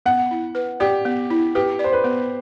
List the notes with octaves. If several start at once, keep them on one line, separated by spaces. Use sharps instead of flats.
B3 F#5
E4
B4
G4 D5
B3
E4
G4 B4
D5
C5
B4
B3